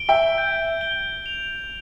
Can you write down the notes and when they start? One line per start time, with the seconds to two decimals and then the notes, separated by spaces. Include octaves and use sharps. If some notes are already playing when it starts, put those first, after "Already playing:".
Already playing: D7 G7
0.09 E5 G5
0.38 G6
0.81 G7
1.26 F7